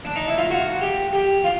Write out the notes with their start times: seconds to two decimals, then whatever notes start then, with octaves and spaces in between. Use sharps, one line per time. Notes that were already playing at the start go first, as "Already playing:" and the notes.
0.05 D4
0.16 D#4
0.28 E4
0.38 F4
0.50 F#4
0.81 G4
1.13 G4
1.44 F4